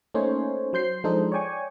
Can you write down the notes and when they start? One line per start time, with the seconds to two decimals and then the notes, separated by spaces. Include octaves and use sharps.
0.14 A3 A#3 C#4 D#4 C5 C#5
0.73 F#3 C5 G6 C7
1.04 F3 G#3 D4 D#4 A4 C5
1.32 C#5 D5 G5 G#5 C#6